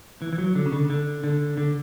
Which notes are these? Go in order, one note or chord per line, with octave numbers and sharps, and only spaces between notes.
E3
E3
F#3
D3
C#3
D3
D3
D3
D3